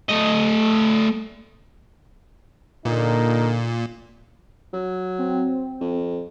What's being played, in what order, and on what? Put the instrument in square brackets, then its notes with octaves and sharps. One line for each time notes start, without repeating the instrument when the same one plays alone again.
[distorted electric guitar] A3 D#5
[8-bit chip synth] A#2 [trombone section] D3 D#4 A#4
[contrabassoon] F#3
[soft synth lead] C4
[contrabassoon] F2